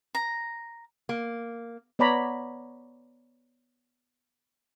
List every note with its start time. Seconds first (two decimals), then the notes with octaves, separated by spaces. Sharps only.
0.15 A#5
1.09 A#3
1.99 B3 C#5 D5 A#5 B5